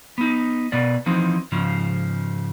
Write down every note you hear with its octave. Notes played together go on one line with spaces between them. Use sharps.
B3 D#4
B2 B3 D5
E3 F3 C4 D#4
G#2 C#3 F3